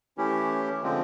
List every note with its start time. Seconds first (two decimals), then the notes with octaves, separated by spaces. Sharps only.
0.17 E3 A3 C#4 E4 G4
0.83 D3 F3 G#3 C4